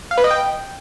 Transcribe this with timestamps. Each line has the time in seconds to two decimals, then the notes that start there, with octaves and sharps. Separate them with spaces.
0.11 F5
0.18 B4
0.24 D#5
0.30 G5